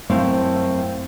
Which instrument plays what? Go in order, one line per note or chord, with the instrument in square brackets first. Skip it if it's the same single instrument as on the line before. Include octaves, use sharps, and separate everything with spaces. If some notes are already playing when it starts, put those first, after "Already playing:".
[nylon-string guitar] F#2 A3 C4 E4 F5